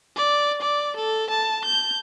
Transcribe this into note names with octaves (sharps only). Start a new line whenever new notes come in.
D5
D5
A4
A5
G6